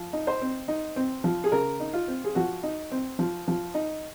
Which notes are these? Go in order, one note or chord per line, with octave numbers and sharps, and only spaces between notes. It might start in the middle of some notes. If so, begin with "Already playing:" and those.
Already playing: F3
D#4
C5
C4
D#4
C4
F3
G#4
C#3 A#4
D#4
F4
C4
G#4
F3 F#4
D#4
C4
F3
F3
D#4